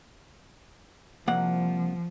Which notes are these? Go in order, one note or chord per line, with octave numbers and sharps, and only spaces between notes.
C2 F3 A#3 F#5